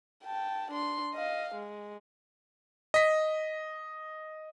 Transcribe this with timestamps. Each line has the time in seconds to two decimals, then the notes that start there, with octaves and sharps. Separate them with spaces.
0.24 G5 A5
0.71 D4 C6
1.14 D#5 F5
1.55 G#3
2.94 D#5 B6